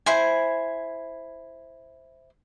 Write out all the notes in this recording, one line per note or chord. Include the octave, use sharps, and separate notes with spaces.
E4 C5 G#5